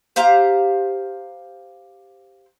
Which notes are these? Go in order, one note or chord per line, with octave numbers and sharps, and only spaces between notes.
G4 C5 F5 A#5